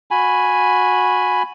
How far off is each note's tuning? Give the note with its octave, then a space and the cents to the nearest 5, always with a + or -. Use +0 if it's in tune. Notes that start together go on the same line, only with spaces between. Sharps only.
F#4 -25 G#5 +0 B5 +0